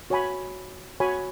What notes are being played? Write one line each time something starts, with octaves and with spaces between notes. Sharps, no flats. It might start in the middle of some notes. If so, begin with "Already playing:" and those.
F#4 C#5 G#5 B5
F#4 C#5 G#5 B5